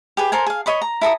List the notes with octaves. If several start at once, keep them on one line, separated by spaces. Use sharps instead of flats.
G4 G#4 B4
A4 A#4 C5 G#5
G#4 F5
C#5 D#5 B5 C#6
A#5
E4 A4 A#5 D#6